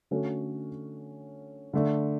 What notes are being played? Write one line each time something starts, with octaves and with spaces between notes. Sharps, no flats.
D3 A3 C#4 F#4 A4
D3 A3 D4